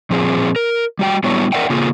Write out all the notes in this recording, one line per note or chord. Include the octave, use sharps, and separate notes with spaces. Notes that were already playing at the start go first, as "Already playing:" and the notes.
A#2 F3 C4 G#4
A#4
G3 F#4 G5
F#3 G3 B3 D4 E4 C#5
A#4 C5 D5 E5 F#5 G5
C#3 A#3 F4 G#4